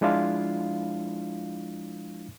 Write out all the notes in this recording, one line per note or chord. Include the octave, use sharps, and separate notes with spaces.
F3 G#3 D4 E4 F4 F5